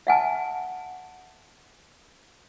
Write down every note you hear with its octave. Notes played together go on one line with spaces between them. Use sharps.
E5 F#5 G#5 A5